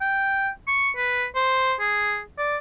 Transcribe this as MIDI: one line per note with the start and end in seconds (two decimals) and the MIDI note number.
0.01 0.49 79
0.68 0.90 85
0.97 1.26 71
1.35 1.74 72
1.80 2.21 68
2.39 2.57 74